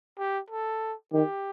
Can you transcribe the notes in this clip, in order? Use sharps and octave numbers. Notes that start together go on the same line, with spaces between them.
G4
A4
D#3 G4